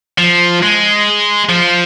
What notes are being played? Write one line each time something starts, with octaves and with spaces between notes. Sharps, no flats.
F3
G#3
F3